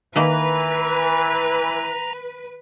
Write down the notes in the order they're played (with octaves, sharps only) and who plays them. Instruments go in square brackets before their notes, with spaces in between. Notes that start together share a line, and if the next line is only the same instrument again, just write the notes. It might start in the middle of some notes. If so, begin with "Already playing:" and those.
[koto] D#3 A#3 [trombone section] E3 [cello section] B4 [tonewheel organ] A#5